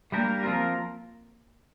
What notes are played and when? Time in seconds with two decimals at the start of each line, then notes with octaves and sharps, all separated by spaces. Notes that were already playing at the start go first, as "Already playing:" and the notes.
0.12 G3 A#3 D4 G4 A#4
0.43 F3 C4 F4 A#4